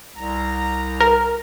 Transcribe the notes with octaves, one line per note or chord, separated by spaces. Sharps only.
C2 A#5
A#4